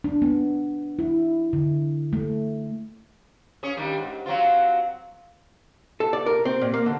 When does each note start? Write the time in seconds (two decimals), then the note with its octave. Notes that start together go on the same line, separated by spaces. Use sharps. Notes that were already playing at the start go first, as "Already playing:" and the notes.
0.04 D4
0.22 B3
0.99 E4
1.53 D3
2.13 A3
3.63 C#4 G#4 C#5
3.77 D#3 G3 D4
3.98 G#2
4.26 F#3 C4 F4
6.00 A4
6.13 D5
6.26 A#4
6.45 C4
6.61 A#2
6.74 A#3
6.86 D3